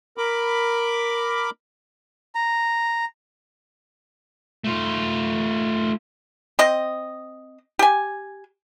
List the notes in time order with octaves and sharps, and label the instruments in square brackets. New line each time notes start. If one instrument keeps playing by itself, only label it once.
[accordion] A#4 B5 D6
[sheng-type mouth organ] A#5
[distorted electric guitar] A3 F4
[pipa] C4 D#5
G4 G#5